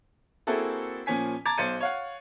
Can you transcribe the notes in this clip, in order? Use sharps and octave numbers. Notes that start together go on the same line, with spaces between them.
A#3 C4 E4 F#4 G#4 A4
A#2 F3 C#4 G#5 B6
A5 A#5 D6 G#6 A6
B1 C5 A6 C#7 D#7
C#5 F5 F#5